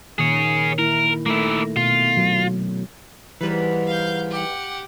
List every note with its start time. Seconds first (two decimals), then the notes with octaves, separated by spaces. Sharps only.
0.19 A#2 D#3 G#4 C#5
0.79 A#3 E4 A#4
1.26 A3 A#3 D#4 E4
1.76 B2 F4
2.17 F#3
3.41 G#2 E3 G3 B4
3.87 F5 G6
4.30 G4 F#5